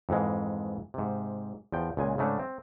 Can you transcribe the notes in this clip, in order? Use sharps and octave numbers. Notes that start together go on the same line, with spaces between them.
F2 G#2 E3 G#3
G#2 C3
E2 F3 G5
C#2 A#2 G#3 G#5
G#2 C#3 A3 C#4 D4
C4